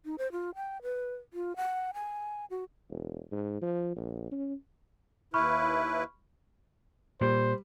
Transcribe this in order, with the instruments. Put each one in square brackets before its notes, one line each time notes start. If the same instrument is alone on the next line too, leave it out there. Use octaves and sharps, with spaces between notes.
[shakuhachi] D#4
C5
F4
G5
B4
F4
F#5
G#5
F#4
[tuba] E1
G#2
F3
A#1
C#4
[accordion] D#2 E4 B4 [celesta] B5 C#6 F6
[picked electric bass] A#2 [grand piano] G3 [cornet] C5